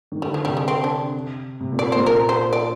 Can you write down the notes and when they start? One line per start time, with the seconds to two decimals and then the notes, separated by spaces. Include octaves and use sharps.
0.12 D#3
0.22 D3 G3
0.34 F3
0.45 C3 G3
0.57 G#3
0.68 C4
0.84 D4
1.60 C3
1.72 A#2
1.79 D5
1.92 A#2 C5
2.06 A#4
2.29 C5
2.53 D5